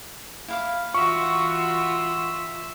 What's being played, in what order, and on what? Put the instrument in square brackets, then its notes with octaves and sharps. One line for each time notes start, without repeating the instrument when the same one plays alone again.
[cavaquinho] E4 F5 D6
[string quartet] E3 F#4 [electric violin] F4 E5 [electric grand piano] C#6